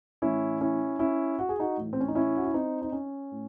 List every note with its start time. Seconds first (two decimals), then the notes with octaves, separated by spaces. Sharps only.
0.22 A2 E3 C#4 E4
0.61 C#4 E4
0.99 C#4 E4
1.39 F#4
1.49 G#4
1.60 D#4 F#4
1.77 A2 E3
1.93 C4
2.00 C#4
2.08 D#4
2.15 C#4 E4
2.37 F#4
2.45 E4
2.54 C4 D#4
2.82 D#4
2.92 C#4
3.31 A2